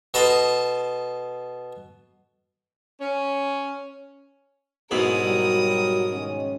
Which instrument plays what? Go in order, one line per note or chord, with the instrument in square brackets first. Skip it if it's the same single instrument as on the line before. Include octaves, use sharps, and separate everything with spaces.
[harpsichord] B2 A4 A5 A#5 C6 D#6
[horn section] C#4
[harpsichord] G#2 B2 E4 [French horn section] F#3 D#4 G#4 [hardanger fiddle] A#4 D#6
[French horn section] F#3 G3
D#3 G#3 C#4